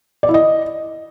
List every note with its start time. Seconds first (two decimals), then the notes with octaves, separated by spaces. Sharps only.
0.23 D5
0.29 E4
0.34 D#5